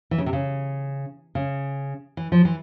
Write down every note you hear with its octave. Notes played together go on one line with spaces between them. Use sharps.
E3
C#3
C3
C#3
C#3
E3
F3
E3